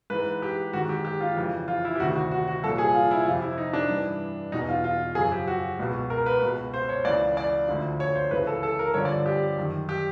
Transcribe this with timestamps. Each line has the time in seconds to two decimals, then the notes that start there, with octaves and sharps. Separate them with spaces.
0.10 G#2 E3 B4
0.42 G4
0.73 G#2 D#3 F#4
0.89 G4
1.05 G4
1.21 F4
1.36 F2 C#3 E3
1.68 F4
1.85 E4
1.96 G4
2.00 D2 C3 D#3 F#4
2.16 F#4
2.31 F#4
2.48 F#4
2.63 C2 A#2 F3 A4
2.78 G#4
2.94 F4
3.11 E4
3.26 F2 C3 F3 F4
3.42 E4
3.58 D#4
3.73 D4
3.89 G2 E3
4.52 E2 B2 D#4
4.69 F4
4.84 F4
5.15 F#2 C#3 F3 G#4
5.32 G4
5.48 F#4
5.79 C#2 B2
6.10 A#4
6.26 B4
6.43 C#2 B2
6.74 C5
6.89 C#5
7.05 C#2 C#3 E3 D5
7.37 D5
7.68 D2 D3 F3
8.00 C#5
8.15 C5
8.31 C#2 C#3 E3 B4
8.47 A4
8.63 A4
8.79 A#4
8.94 G2 D3 F3 C#5
9.05 D5
9.26 G4
9.57 F#2 D#3
9.89 G4